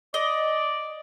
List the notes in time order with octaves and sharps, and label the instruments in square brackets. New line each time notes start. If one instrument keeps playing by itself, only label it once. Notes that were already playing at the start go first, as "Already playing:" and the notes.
[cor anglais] D5 [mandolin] D#5